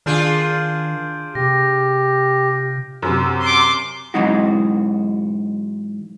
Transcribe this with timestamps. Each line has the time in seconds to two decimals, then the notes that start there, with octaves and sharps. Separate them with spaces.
0.06 D#3 D4 F4 G#4 F6 G6 D7
1.35 C3 G4 A#6
3.02 F#2 C3
3.42 C6 D6
4.14 G#2 E3 F#3 G#3 D#4 F#4